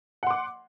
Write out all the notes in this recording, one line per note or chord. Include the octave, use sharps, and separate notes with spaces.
F#5 C6 D6